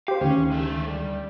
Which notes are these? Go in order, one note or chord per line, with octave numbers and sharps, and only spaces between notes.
G4 C5 F5
D2 D#3 C#4
G#3 A4
G3